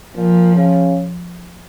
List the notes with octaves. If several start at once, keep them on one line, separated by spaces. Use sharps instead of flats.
A#2 F3
C#3